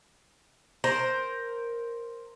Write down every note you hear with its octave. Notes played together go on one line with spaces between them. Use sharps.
A#4 C5